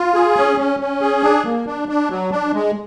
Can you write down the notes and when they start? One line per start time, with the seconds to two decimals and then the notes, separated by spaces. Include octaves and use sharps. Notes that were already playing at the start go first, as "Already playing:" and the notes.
Already playing: F4
0.14 G#4
0.37 C#4
0.58 C#4
0.80 C#4
1.01 G#4
1.23 D4
1.45 A#3
1.67 D4
1.89 D4
2.10 F#3
2.31 D4
2.54 G#3